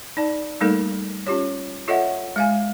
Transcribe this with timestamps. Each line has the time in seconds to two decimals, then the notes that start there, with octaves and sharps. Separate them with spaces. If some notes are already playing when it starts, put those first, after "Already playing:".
0.17 D#4 D5 A5
0.61 G3 A3 A#3 D#4 A4 A#4
1.26 C#4 F4 G4 C#5
1.88 F4 A4 C#5 D#5 E5 F#5
2.36 G#3 F5 G#5